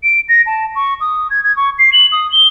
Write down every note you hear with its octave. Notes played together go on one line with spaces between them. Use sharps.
D7
A#6
A5
C#6
D#6
G#6
G#6
C#6
C7
F#7
D#6
G7